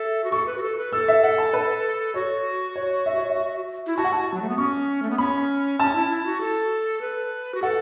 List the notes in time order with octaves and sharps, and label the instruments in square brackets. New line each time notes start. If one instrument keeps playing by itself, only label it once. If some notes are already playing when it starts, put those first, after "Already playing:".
Already playing: [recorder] A4 [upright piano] E5
[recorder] F#4
[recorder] A4 [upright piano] C#6
[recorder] B4
F#4
A4
B4
[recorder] A4 [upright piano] E6
[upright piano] E5
F#5
A5
B4
[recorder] F#4 [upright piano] C#5
[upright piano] C#5
E5
C#5
E5
[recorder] E4
[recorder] F#4 [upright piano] A5
[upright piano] F#5
A5
[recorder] F#3
A3
B3
[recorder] C#4 [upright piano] C#6
[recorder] A3
B3
[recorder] C#4 [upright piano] B5
[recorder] C#4 [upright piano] A5
[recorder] E4
E4
F#4
A4
B4
F#4
[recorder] A4 [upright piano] F#5